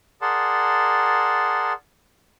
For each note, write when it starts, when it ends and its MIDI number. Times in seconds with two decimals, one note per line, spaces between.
0.22 1.73 68
0.22 1.73 70
0.22 1.73 74
0.22 1.73 78
0.22 1.73 81
0.22 1.73 84